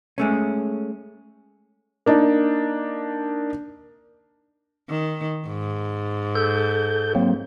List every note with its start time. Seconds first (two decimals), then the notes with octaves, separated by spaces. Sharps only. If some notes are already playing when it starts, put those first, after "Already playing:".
0.18 G#3 A3 C#4
2.06 A#3 D4 D#4
4.90 D#3
5.47 G#2
6.35 A4 G6
7.15 F#3 A#3 C4